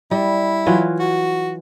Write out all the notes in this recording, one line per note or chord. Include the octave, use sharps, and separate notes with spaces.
G3 E4
E3 F#3 F4
F#4